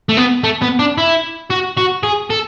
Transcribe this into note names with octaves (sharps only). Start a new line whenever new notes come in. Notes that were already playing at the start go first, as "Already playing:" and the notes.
A3
B3
A3
B3
D4
E4
F#4
F#4
G#4
A4